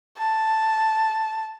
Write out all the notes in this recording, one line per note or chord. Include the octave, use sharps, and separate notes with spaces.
A5